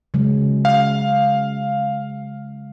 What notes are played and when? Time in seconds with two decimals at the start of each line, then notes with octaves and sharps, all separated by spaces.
0.14 C#3 F#3 G#3
0.65 F5